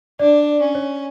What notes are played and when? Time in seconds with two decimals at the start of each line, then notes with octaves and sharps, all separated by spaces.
0.19 D4 D5
0.61 C#4
0.75 C#5